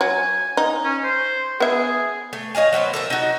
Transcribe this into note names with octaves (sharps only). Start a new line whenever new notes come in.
F#3 G#5
D#4
C#4
C5
B3 G#4 E5
A3
C#5 D#5 F5 G#5
F#3 B3 D#4 C5
A4 A#4 E5
D#4 F#4